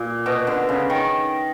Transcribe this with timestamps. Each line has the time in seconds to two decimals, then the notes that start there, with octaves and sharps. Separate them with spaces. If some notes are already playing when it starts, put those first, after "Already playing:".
Already playing: A#2
0.26 B2
0.47 D3
0.69 C#3
0.90 D#3